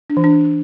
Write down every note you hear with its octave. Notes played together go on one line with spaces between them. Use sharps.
D4
E3
D4